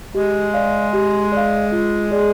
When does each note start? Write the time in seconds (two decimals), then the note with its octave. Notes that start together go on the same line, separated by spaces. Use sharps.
0.15 G#3 G4
0.54 D5 F5
0.93 G4
1.32 D5 F5
1.72 F4
2.11 G#4 D5